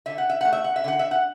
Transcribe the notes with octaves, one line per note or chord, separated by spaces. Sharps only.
D3 E5
F#5
E5
A3 F#5
E5
F#5
E5
D3 F#5
E5
F#5